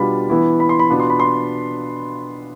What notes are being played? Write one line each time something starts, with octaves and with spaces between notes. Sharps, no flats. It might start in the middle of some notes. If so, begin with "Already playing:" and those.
Already playing: B2 G3 B3 D4 F4 B5
E3 B3 E4
B5
C6
B5
B2 B3 D4 F4
C6
B5
C6